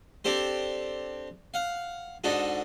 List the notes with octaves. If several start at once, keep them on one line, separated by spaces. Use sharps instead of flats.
C4 D4 G4 A4 C5
F5 F#5
G#2 D4 D#4 F#4 A4